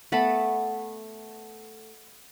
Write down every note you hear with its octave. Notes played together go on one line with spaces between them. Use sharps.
A3 B3 A5 B5